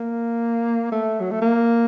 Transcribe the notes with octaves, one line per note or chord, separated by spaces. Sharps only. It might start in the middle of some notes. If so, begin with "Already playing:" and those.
Already playing: A#3
A3
F#3
A3
A#3